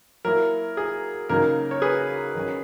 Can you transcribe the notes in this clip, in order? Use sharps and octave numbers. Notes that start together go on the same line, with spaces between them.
F#3 A#3 E4 A#4
G#4
C#3 F#3 A#3 D#4 A#4
C#5
G#4 B4
D#3 F#3 C#4